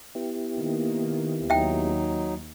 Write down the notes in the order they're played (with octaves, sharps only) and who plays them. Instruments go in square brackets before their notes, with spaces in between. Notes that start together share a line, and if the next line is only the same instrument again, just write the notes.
[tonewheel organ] B3 E4 G4
[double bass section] D#3 A#3
[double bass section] D#2 [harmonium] F#3 D#4 [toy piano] E5 G5